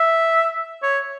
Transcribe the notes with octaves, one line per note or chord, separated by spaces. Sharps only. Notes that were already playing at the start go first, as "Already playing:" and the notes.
Already playing: E5
C#5